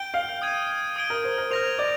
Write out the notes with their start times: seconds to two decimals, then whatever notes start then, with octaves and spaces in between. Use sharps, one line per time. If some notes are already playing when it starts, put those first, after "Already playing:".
Already playing: G5 G6 D7 G7
0.14 F5
0.42 D#6 G#6 D#7
0.96 D#6 G#6 D7 G7
1.10 A#4
1.24 C5
1.38 A#4
1.51 C5 F6 A#6 F7
1.79 D5